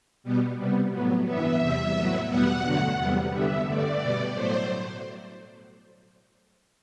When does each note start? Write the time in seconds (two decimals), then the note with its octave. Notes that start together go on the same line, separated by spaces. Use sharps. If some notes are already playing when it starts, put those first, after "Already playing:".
0.24 B2 G3 B3
0.57 C3 G3 B3
0.92 A2 F#3 B3
1.25 G2 E3 B3 E5
1.60 E2 C3 G3
1.95 A2 F#3 B3
2.29 E2 B2 G3 B3 F#5
2.62 G2 D3 F#3 A3
2.97 E2 C3 G3 B3
3.32 G2 D3 G3 B3 E5
3.66 G2 D3 A3 D5
4.00 B2 G3 B3
4.34 A2 F#3 A3 C5